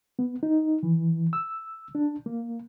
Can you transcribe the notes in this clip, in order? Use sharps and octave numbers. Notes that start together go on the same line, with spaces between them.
B3
D#4
E3
E6
D4
A#3